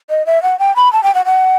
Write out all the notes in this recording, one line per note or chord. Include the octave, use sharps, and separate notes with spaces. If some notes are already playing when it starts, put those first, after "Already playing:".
D#5
E5
F#5
G5
B5
A5
G5
F#5
F#5